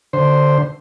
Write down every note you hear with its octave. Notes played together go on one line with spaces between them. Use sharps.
D3 C5